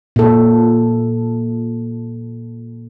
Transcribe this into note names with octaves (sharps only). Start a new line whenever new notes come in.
A#2 A4